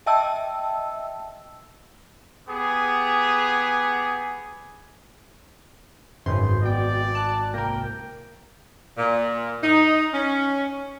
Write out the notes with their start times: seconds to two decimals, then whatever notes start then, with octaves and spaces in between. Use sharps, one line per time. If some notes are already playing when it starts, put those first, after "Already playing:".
0.06 D#5 E5 G5 A5 E6
2.48 B3 G4 G#4
6.26 G#1 F#2 C#3 B4 C6 G6
6.63 B2 D5 G5
7.15 A5 F#6
7.54 C2 A#3 A#4 G5 A#6
8.97 A#2
9.62 D#4
10.13 C#4